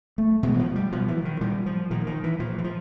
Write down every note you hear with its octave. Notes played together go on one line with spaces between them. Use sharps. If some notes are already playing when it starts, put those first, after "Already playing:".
A3
B2 G#3
E3
F3
G3
B2 F3
E3
D#3
A#2 G3
F3
A#2 D#3
D#3
E3
A#2 F3
E3
F3